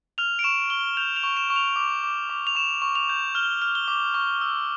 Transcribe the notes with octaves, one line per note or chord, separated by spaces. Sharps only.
F6 F7
D7
C#6 E7
C#6 G7
G6 F7
F7
C#6
E7
C#6
F7
D6
D6
D6
F7
C#6 E7
C#6
F7
G6
F6 G7
F6
G7
D6
C#6
E6